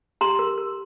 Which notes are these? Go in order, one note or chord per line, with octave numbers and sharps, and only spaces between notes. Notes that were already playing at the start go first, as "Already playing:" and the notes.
G4 A#5 C6
A#4
A#4